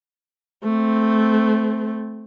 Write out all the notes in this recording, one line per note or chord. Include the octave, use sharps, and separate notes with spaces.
A3 C4